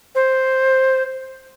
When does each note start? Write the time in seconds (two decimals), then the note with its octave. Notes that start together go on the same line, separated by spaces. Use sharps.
0.15 C5